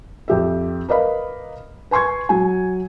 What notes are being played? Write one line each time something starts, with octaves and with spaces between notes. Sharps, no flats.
F2 G4 E5
A#4 B4 D5 D#5 F5 B5
B4 G#5 C6 C#6 G#6
F#3 G#5